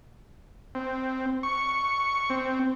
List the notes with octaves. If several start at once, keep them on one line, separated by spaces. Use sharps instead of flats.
C4
C#6
C4